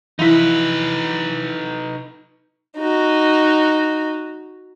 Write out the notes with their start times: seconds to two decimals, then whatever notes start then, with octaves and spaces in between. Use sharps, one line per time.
0.19 E3 F3 D#4 E4 B4
2.77 D#4 F#4